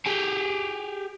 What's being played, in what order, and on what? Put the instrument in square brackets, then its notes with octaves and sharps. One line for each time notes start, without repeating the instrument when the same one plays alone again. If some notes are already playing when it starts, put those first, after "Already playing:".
[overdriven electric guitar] G4 G#4